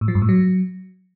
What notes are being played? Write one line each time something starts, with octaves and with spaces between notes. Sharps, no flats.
A2
F3
G2
A2
F#3